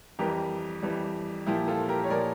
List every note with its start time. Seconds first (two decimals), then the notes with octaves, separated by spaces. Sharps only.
0.19 F2 E3 G3 G4 A#4
0.82 F2 E3 G3
1.47 A#2 F3 E4 G4
1.68 F4 A4
1.89 G4 A#4
2.04 C#5
2.10 A#2 F3 A#4 D5